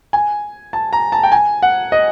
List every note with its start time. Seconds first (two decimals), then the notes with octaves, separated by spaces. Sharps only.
0.13 G#5
0.73 A5
0.93 A#5
1.12 A5
1.23 G5
1.32 G#5
1.62 F#5
1.92 D#5